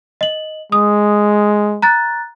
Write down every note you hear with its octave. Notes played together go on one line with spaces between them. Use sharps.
D#5 F#7
G#3 D#6
A#5 F#6 A6